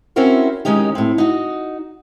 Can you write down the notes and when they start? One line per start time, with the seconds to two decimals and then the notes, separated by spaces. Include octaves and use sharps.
0.16 C4 C#4 E4 F#4 A#4 C5
0.65 D#3 G#3 C#4 D#4 G4
0.95 A2 C4
1.18 D#4 F#4